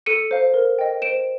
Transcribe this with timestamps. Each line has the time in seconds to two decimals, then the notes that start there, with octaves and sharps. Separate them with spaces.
0.06 A4 C#7 D#7
0.31 C5 F5
0.54 A#4
0.79 D#5 G5
1.02 C5 D7 E7